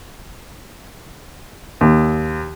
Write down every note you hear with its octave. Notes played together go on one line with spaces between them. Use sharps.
D#2